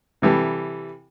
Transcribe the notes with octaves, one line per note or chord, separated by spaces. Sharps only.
C3 E3 G3 A4